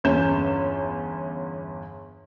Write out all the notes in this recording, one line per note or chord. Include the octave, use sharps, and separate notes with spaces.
G1 E2 C#4 G6 E7